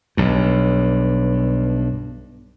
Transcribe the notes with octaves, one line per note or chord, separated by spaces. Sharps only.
B1 G2